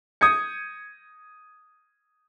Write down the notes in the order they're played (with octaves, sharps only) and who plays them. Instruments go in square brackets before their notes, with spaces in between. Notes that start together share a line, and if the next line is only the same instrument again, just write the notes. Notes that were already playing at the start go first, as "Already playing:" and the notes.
[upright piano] D#6 G6 G#6 C#7